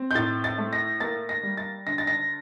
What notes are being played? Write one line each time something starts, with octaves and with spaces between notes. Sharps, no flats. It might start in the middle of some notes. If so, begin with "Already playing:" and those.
Already playing: C4
G6
A2 A6
A6
A3
A#6
A#3 A6
A#6
G3
A6
D2 A#6
A6
A#6